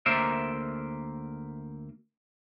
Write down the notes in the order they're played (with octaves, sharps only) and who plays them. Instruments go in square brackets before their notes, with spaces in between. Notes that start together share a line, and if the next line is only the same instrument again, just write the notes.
[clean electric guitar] D2 A#3 A#4 C5 E5